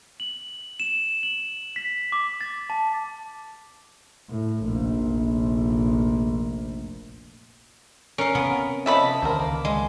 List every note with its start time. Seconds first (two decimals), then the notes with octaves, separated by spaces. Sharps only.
0.20 F#7
0.80 E7
1.23 F#7
1.76 B6
2.12 D6
2.41 A6
2.70 A5
4.29 A2
4.65 F1 A#1
8.18 C#4 A#4 F5
8.35 C3 B3
8.86 F3 C#4 D#5 E5 A5 B5
9.22 C#2 D3 D#3 A#4 C5
9.40 A#3
9.65 G#3